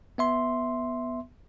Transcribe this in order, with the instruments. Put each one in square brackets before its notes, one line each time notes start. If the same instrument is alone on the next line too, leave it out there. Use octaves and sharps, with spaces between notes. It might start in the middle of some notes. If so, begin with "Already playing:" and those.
[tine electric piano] B3 E5 C6